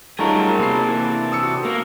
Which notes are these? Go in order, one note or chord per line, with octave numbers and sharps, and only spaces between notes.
F#3 G3 A3 C#4 D#4 F4 G#4 A#4
C3 A#3 D4 A4 C7
E3
D#6 E6 C#7
F#4
A#3